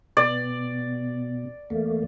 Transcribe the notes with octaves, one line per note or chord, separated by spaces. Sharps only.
B2 D5
E2 A3 A#3